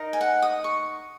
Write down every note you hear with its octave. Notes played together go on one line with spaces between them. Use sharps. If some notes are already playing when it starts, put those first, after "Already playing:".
Already playing: D#4 A#4 D#5
G#5
F#5
D#6
C#6